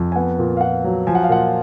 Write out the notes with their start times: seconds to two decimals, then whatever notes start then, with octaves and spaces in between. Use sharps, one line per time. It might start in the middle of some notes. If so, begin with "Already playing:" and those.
Already playing: F2
0.12 G#5
0.16 B3 F#5
0.39 A#2
0.57 F5
0.61 A#2 F#5
0.84 F#3
1.07 F3 G#5
1.15 F#5
1.24 F5
1.29 A#2 F#5